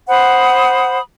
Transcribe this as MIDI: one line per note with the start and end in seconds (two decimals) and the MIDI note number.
0.08 0.99 72
0.08 0.99 78
0.08 0.99 83
0.08 0.99 87